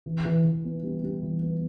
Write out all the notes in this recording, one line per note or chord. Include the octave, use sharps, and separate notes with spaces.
E3
E3
E3
B3
G3
G3
E3
B3